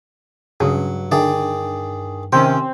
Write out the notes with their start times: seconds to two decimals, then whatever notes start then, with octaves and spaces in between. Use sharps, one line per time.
0.60 G2 C#3 F#3 G#4
1.11 D3 D#3 G#4 D5
2.32 C3 D#3 C4 C#4 G5